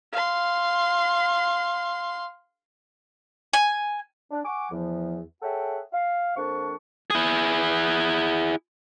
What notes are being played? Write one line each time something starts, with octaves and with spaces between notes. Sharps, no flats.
F5 C6
G#5
D4
F#5 G#5 C#6 D6
E2 F3
G#4 A4 C#5 E5 F#5 G5
F5
F2 F3 A#3 D4 C#6
E4 G#4